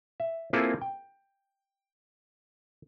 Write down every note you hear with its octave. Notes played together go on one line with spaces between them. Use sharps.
E5
A#3 C4 E4 F4 G#4 A4
G5